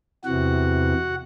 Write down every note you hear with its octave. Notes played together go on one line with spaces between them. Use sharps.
E2 C3 E3 F#4 F#5